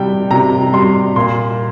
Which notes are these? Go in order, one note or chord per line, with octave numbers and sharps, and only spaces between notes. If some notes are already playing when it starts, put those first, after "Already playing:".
Already playing: C3 G3 G5
C3 A#5
G3 C6
A#2 C6